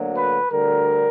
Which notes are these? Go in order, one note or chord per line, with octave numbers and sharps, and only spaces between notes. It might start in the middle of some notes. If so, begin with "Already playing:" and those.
Already playing: D2 D3 F#3 A#3
B4
D2 D3 G3 A#4